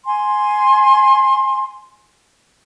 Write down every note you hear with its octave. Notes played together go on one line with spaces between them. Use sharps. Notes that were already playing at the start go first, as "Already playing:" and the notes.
G#5 C6